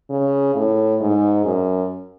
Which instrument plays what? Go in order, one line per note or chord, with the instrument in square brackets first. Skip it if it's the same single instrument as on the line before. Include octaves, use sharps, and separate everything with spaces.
[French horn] C#3
A2
G#2
F#2